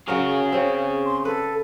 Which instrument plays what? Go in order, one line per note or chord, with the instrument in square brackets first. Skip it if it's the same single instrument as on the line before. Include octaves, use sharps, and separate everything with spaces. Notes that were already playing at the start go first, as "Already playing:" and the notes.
[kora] C#3 F#3 A#4 [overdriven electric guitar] G#4 C#5
[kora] C#3 C4
[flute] C6
[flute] A4 [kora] B4